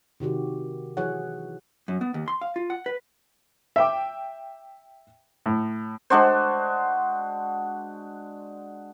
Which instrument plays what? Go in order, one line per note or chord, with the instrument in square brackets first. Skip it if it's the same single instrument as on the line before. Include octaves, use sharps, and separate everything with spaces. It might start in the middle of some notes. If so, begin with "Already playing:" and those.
[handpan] C3 D#3 F#4 G4
E3 F#3 G#4 C#5 F#5
[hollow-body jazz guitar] F#2
B3
D#2
C6
F5
F4
F#5
B4
[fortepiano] E5 G5 D6
A2
[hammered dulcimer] G#3 D4 F#4 C5